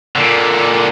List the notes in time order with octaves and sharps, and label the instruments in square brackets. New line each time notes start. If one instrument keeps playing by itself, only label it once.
[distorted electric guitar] A#2 D3